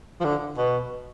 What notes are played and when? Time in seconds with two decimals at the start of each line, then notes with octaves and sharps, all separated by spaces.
0.20 F3
0.25 D3
0.58 B2